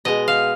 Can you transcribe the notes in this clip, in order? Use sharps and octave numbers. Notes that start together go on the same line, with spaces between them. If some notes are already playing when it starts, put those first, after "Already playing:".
B2 G#3 D#5
F5